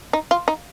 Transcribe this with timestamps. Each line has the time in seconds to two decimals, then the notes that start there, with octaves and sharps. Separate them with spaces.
0.13 D#4
0.31 F4
0.48 D#4